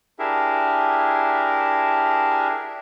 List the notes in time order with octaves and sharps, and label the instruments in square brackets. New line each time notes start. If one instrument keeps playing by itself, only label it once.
[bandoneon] D4 E4 G4 G#4 A#4 E5